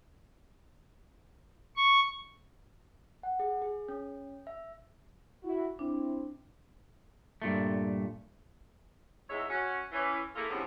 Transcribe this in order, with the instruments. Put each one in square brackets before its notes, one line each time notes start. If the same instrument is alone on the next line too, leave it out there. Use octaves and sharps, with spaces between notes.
[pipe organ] C#6
[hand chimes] F#5
G#4
G#4
C#4
E5
[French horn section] E4 F#4
[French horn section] C4 E4 [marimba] D4
[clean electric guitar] G2 A#2 A3
[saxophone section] E2 G#3 D#4 C#5 E5
C#4 F#4
E3 C#4
A3 A#3 E4 F4 G#4 A4
E2 G2 F3 C4 C#4